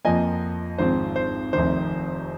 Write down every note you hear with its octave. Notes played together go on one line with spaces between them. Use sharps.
F2 F3 A#3 D#5 G#5
G#1 G#2 F3 C4 C5
C5
F1 F2 C3 D#3 C5